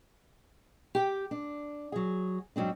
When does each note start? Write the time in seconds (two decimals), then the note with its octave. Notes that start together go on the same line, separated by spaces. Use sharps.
0.95 G4 G5
1.31 D4
1.92 F#3 G#4
2.56 G#2 F#3 C4 D4